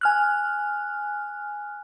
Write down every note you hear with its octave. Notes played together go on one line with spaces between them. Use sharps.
G#5 F6 F#6